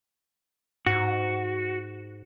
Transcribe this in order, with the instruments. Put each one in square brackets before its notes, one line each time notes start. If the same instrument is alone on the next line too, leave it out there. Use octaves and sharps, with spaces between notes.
[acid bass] G#2 [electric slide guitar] F#4